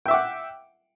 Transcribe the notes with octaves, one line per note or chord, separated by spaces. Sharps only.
E5 F#5 G5 D6